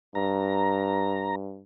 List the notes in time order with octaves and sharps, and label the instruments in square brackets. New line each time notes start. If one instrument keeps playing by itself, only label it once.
[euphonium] G2 [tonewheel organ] A#5